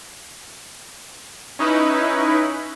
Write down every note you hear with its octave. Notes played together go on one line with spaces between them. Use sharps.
C#4 D#4 E4 B4